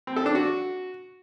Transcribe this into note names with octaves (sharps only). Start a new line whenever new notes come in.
C4
A4
D4
F#4